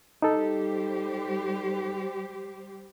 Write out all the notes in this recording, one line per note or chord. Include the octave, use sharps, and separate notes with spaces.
G3 D#4 G4 A4 C5